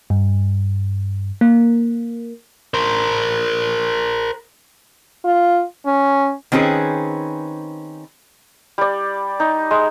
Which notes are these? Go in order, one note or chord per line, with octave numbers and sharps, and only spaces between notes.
G2
A#3
A#4 C5
F4
C#4
D#3 C4 C#4 G#4 B4
G3 D5
D#4
G#3